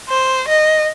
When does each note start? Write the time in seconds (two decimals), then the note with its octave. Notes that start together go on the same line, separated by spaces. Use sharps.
0.10 C5
0.48 D#5